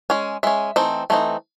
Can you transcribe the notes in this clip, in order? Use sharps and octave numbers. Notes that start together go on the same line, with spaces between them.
G#3 C#4
G#3 C#4 E5
E3 A3 C4 D#4
E3 A3 C4 D#4